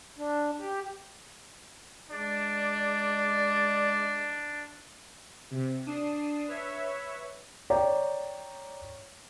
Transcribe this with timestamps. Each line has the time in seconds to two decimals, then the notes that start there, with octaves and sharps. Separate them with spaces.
0.19 D4
0.60 G4
2.10 G#3 D4 D5
5.51 C3
5.86 D4 D#6 C7 E7
6.48 B4 C#5 E5
7.70 C#5 D5 G5 A#5